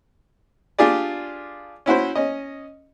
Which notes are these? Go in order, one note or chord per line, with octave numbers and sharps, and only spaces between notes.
D4 F4 G4 G#4 D5
C#4 E4 F#4 C5
C#4 D#5